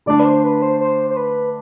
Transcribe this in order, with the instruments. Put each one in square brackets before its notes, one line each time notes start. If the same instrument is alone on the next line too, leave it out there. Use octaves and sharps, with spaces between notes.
[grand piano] D3 A3 D4 [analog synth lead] D5
[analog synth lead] B4
C5
B4
C5
C5
C5
B4